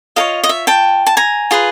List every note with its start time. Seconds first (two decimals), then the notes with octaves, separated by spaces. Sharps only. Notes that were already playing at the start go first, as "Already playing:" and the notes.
0.16 F4 A#4 C#5 D#5 F5
0.43 D#5
0.49 E5
0.67 G5 A5
1.06 A5
1.17 G#5 A#5
1.51 F4 G#4 B4